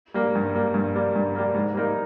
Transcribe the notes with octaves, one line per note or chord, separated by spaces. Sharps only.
G3 A#3
G2
G3 A#3
G2
G3 A#3
G2
G3 A#3
G#2
G3 A#3 D#4 A#4